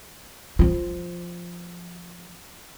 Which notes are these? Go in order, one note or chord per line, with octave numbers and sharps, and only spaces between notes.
F3 F4